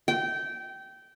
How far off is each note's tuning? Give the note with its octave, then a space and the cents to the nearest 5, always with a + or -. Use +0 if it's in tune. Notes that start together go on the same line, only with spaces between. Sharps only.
G5 -20